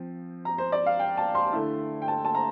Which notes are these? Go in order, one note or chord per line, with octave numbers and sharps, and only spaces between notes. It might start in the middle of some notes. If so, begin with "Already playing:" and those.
Already playing: F3 C4
A#5
C5
D5
F5
G5
A5
C6
D3 A3 E4
G5
A5
A5
A#5